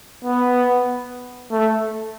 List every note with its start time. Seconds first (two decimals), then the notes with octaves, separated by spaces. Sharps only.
0.25 B3
1.52 A3